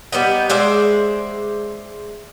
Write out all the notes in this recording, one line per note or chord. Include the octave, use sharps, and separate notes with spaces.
G3 B3 D#4
G#3 C5 D5 E5